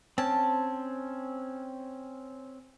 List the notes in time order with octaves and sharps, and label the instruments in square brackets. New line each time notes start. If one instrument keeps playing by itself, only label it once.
[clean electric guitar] C4 C#4 [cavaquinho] A5